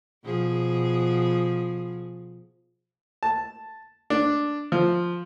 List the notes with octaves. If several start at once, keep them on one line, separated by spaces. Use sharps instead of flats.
B2 F3 G#4
A5
D4
F3